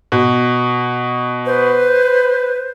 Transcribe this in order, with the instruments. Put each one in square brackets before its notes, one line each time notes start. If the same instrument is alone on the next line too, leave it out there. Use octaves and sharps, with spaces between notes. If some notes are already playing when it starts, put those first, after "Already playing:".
[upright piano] B2
[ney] B4 [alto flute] C5